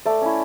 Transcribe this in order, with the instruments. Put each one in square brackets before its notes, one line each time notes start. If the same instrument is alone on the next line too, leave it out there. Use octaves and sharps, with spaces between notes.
[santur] A3 D5
C#4 E4